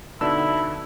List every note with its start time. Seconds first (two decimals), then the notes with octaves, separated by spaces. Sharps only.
0.21 B2 D3 D#4 E4 D5 A5 E6